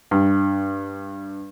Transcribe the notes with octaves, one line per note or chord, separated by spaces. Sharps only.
G2